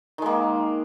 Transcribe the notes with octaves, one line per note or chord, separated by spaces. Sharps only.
D#3 G#3 A#3